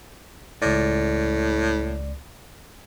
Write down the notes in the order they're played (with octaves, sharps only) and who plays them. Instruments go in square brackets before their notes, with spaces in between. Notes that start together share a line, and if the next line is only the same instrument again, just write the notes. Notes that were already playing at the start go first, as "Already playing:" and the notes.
[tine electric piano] C#2 D5 [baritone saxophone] A2